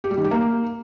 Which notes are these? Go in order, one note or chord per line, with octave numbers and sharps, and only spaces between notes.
G4
G3
D#3
G4
A#3